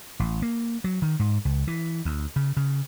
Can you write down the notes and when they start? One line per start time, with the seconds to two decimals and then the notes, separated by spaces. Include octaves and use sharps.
0.20 A1
0.42 A#3
0.84 F#3
1.02 D#3
1.19 G#2
1.45 C#2
1.67 E3
2.05 D2
2.36 C#3
2.57 C#3